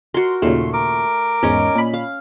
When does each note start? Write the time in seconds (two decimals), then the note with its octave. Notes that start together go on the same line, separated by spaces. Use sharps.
0.14 F#4 A#4 C6
0.42 D#2 A#2 C#3 A3 C6
0.73 A#4 D6
1.43 E2 G#2 C#4 D#5
1.76 A#2 B5
1.93 F5